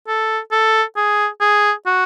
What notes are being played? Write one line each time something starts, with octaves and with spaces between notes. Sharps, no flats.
A4
A4
G#4
G#4
F#4